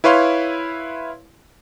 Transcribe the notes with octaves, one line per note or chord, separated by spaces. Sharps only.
E4 B4 C#5 F5 C6